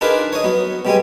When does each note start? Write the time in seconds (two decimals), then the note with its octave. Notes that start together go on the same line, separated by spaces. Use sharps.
0.01 D4 D#4 F4 G#4 A#4 B4
0.33 C#5 D#5
0.44 F#3 B3
0.85 B2 G3 G#3 G#5